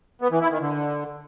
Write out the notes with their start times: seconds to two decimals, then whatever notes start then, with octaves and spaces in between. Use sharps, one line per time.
0.22 B3
0.31 E3
0.41 E4
0.50 D#3
0.60 D3